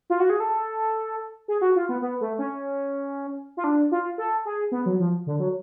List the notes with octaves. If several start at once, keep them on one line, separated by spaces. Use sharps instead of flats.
F4
F#4
G#4
A4
G#4
F#4
F4
B3
B3
A3
C#4
F4
D4
F4
A4
G#4
B3
F#3
F3
D3
F#3